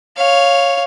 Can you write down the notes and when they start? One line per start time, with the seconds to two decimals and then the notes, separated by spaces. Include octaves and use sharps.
0.17 C#5 F5